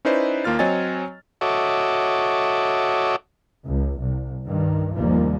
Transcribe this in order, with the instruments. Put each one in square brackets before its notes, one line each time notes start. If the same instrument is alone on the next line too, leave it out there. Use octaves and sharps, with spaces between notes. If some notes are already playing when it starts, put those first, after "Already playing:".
[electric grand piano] C#4 D#4 E4 B4 C5 D5
D#2 A#3 F4 F6 A6
F#3 C4 C#5 D#5 G#5 A6
[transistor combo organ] F#4 A4 C#5 D#5 E5 D6
[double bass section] C#2
C2
G2 D#3
F1 D#2 F3 G3 A#3